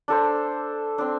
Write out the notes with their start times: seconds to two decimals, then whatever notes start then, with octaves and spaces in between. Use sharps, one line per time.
0.08 D4 A4 C5
0.98 C4 D4